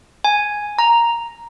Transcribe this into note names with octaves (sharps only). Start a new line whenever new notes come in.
G#5
A#5